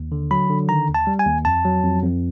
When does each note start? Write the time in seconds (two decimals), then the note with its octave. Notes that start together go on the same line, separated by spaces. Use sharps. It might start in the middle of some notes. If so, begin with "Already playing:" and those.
Already playing: D#2
0.12 D3
0.31 F#3 B5
0.50 D3
0.69 D#3 A#5
0.88 D#2
0.94 A5
1.07 G3
1.19 G#5
1.26 D#2
1.45 F2 A5
1.65 F#3
1.83 F2
2.03 F2